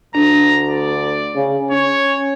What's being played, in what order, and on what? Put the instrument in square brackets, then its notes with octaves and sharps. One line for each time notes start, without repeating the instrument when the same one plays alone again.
[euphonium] D2 [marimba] D4 [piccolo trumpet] A#5
[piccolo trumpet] D5
[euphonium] C#3
[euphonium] C#4 [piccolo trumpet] C#5